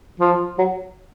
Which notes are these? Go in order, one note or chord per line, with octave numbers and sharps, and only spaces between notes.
F3
F#3